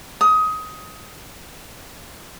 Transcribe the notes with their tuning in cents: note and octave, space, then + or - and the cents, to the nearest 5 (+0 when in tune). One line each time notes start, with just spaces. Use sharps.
D#6 +20